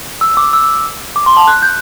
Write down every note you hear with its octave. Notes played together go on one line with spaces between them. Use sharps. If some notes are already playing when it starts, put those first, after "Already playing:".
E6
D6
E6
D6
C6
A5
F#6
G6